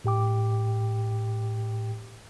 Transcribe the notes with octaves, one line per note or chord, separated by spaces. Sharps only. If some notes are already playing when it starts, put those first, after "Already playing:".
A2 G4 G5 D6